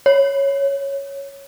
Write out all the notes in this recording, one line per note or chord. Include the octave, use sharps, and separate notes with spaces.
C#5